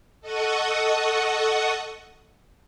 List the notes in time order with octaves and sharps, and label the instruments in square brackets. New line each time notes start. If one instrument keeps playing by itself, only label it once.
[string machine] A4 D#5 F#5 C#6 D#6